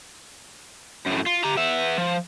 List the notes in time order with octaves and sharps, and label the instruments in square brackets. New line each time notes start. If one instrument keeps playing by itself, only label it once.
[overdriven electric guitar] F#2 A2
F4
G4 A#5
B3 E5
F3